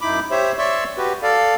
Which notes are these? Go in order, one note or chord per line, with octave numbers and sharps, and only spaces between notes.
F#2 D#4 E4 B5 D6
G4 C5 C#5 E5
C#5 D5 E5 C6 C#6 E6
F#4 G4 B4
A4 D5 F5